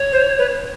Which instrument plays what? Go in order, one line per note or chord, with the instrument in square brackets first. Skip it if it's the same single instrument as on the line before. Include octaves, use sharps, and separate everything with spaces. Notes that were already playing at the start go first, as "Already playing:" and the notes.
Already playing: [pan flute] C#5
[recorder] C5
B4